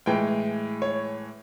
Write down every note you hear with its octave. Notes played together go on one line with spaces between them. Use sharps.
A2 E3 G#3 G5
C#5